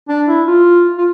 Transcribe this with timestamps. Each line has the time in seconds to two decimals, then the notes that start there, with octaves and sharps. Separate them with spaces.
0.09 D4
0.28 E4
0.47 F4
0.98 F4